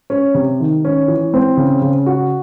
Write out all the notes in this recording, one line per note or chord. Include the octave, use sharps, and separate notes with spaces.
C#4
C3
D#3
C#4
E3
C4
C#3
C#3
F#4